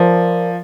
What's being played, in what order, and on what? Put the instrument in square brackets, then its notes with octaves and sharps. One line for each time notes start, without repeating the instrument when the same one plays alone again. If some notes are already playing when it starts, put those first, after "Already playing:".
Already playing: [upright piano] F3 [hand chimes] F4 A#4 D5